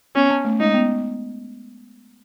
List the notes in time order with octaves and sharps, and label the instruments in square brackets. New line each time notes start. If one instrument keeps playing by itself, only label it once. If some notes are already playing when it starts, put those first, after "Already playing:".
[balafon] B3 [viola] C#4
[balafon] C#4
A3
[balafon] G#3 [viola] D#4
[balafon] B3